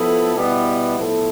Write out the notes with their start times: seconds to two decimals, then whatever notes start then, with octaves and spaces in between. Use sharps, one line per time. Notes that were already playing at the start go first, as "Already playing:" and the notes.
Already playing: F3 B3 E4 A4
0.35 B2 G3 B3 E4
0.98 A2 F3 B3 E4 A4